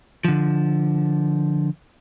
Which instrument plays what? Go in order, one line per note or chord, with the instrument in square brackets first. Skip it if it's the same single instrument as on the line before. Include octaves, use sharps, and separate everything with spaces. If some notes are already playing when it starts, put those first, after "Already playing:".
[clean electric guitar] D3 F3